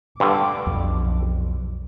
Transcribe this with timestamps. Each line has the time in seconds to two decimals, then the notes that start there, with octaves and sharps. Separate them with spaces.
0.20 G2 D3 D6
0.67 B1 F2